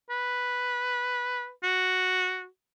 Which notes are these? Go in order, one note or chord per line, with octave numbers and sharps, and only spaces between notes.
B4
F#4